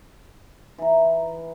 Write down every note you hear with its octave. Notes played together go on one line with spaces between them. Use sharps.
E3 A#5